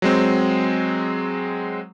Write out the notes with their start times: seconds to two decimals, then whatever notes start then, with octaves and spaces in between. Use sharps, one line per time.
0.02 F#3 G#3 C4